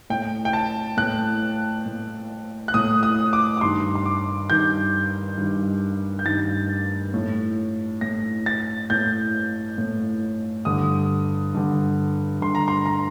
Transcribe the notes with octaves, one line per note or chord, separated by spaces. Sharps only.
A2 G5
G5
A5
A2 F#6
A2
F#6
A2 D#6
D#6
D6
D6
G2 D#3 C6
C6
D6
G2 D#3 G6
G2 D#3
G6
G2 D#3 A6
A2
A2 A#6
A6
A2 G6
A2
G2 D3 D#6
G2 D3
G2 D3 C6
A#5
C6
A#5